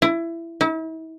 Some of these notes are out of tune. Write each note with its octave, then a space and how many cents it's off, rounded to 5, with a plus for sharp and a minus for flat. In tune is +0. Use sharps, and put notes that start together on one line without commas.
E4 +20
E4 -40